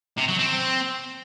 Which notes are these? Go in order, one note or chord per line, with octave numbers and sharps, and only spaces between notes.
C3
F#3
C4